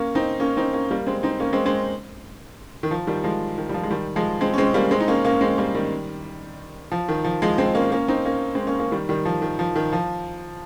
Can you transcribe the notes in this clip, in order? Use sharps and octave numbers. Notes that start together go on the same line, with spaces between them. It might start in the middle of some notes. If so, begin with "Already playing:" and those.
Already playing: A#3 C#4
C4 D#4
A#3 C#4
C4 D#4
A#3 C#4
G3 A#3
G#3 C4
C4 D#4
A#3 C#4
G#3 C4
G#3 C4
D#3
F3
D#3 G3
F3 G#3
D#3
G3
F3
G#3
D#3 G3
F3 G#3
G#3 C4
C#4
G#3 C4
G3 A#3
G#3 C4
D#4
A#3 C#4
A#3 C#4
G#3 C4
G3 A#3
D#3 G3
F3
D#3
F3
F3 G#3
G#3 C4
A#3 C#4
A#3 C#4
C4 D#4
A#3 C#4
G#3 C4
A#3 C#4
A#3 C#4
D#3 G3
D#3 G3
F3
D#3
F3
D#3
F3